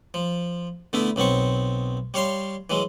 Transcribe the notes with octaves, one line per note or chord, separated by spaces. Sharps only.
F3
D3 A3 B3 E4
B1 F#3 B3 C4 C#6
G3 C#5 F5 C6
E3 F#3 G#3